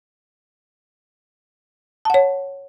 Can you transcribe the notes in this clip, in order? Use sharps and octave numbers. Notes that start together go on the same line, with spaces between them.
C#5 F#5 A5